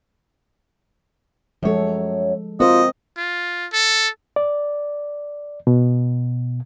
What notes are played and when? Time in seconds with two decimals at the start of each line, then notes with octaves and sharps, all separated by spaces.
1.63 F#2 F3 G#3 A4 C#5
2.60 C4 F4 F#4 A#4 C5 D#5
3.17 F4
3.73 A4
4.36 D5
5.67 B2